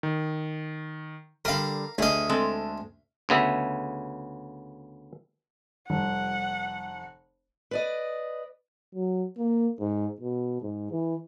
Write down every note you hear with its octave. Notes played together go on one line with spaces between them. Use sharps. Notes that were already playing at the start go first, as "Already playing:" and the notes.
D#3
D3 G3 A#4 F5
D2 G#4 D#5 F5
G#3 C4 A4
D2 C#3 B3 E5
F1 G3 F#5
B4 D5 D#5
F#3
A#3
G#2
B2
G#2
E3